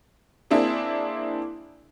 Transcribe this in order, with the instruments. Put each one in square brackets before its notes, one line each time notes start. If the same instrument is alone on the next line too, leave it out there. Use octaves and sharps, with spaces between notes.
[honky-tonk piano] A#3 C4 D4 E4 G#4